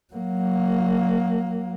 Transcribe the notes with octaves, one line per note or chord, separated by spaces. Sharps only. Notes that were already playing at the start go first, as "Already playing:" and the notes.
F#3 A#3